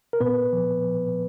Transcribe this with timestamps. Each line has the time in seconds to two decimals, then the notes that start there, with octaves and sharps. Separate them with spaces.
0.13 A#4
0.20 A#2 B3 B4
0.53 F3
0.86 F3